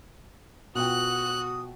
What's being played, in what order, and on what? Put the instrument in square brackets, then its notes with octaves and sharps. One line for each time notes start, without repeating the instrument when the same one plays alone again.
[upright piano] B2 F4 G5 [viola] F#4 [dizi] D#6 [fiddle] F#6